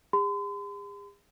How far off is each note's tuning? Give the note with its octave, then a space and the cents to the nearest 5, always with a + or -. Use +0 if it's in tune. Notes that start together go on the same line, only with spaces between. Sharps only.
G#4 -45 C6 -45